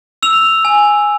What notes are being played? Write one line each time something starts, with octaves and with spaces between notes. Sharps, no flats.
E6 F7
G#5